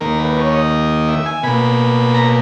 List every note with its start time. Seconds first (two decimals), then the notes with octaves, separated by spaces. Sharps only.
0.01 D#2 D#3 A#3 A#4
0.19 B4
0.37 C#5
0.54 D#5
1.08 E5
1.26 G#5
1.43 B2 A#3 B5
2.15 A#5